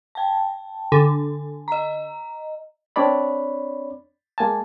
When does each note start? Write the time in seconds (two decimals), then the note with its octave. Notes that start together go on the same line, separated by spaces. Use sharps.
0.15 G5 A5
0.92 D3 G#5
1.68 D#5 A#5
2.96 C4 D4 C#5 D5 B5
4.38 G#3 A#3 G#5 A5